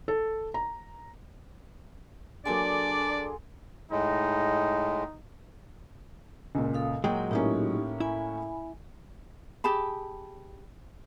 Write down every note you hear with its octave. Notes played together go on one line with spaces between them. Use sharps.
A4
A#5
F#3 A#3 D4 G#4 A4 D5 G#5 C6
A2 G#3 D#4
C#2 A#2
A4 F5 D#6
A#2 F#3 G#3 F#5 G5
A2 A#3 C#4 D#4 E4 G4
E4 G#5 B5
G4 G#4 A5 B5